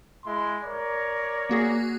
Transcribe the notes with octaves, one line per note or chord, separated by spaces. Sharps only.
G#3 E4 C6
A#4 C#5 D5
A#3 F#4 G#4